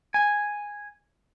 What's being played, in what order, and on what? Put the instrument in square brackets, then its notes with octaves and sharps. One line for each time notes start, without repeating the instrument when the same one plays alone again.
[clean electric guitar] G#5